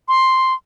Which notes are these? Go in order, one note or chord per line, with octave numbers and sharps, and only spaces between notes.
C6